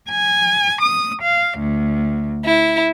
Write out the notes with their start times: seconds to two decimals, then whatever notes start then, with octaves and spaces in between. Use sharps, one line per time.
0.10 G#5
0.82 D#6
1.23 F5
1.59 D2
2.45 E4